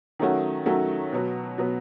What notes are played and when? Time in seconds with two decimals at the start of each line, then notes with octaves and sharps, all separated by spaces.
0.19 D#3 F#3 A3 C#4 F#4
0.66 D#3 F#3 A3 C#4 F#4
1.13 B2 F#3 B3
1.58 B2 F#3 B3